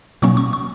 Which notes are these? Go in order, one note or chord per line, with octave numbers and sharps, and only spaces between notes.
B2 F#3 A#3 C#4 C#6
C#6
C#6